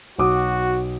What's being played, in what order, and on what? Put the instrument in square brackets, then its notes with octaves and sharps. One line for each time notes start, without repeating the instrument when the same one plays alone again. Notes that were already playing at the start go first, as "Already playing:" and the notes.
[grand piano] B1 D6 D#6 [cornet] F#4